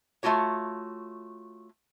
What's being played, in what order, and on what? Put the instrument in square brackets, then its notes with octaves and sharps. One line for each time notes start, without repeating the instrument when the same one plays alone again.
[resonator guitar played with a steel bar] A3 C4 F4 F#4 C#5